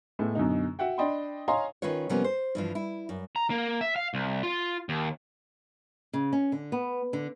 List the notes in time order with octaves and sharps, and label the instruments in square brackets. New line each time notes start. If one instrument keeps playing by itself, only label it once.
[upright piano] A2 G#3 A3 B3
F#2 B2 D3 D#4
F#4 E5 F#5 G5
D4 D5 D#5 G5 B5 C6
C#5 D#5 F5 G#5 A#5 C6
[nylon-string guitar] D#3 C#4 F4 B4 C#5
C3 F3 G3 A#3 B3 C#4
C5
G2 E3 F3
E4
F#2
[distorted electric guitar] A#5
A#3
E5
F5
C2
F4
D#2
[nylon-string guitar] C#3
C#4
D3
B3
D3